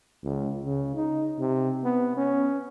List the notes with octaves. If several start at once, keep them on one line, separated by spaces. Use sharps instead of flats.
C#2
C#3
D#4
C3
B3
C#4